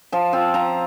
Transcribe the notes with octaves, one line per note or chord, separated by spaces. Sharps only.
F3 A5
C4 F4
F3 A#5